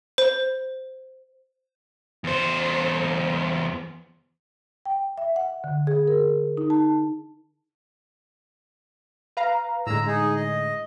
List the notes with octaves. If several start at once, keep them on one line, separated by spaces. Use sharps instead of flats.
C5
E2 C5
G5
E5
F#5
D3
G#4
A#4
D#4
A5
B4 F5 A#5
A2 D3 G#3 A#5 E6
D#4 G#4
D#5